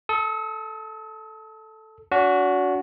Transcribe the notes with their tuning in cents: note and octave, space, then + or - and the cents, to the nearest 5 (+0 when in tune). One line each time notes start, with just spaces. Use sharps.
A4 +0 D#6 +45
D4 -45 F#4 -5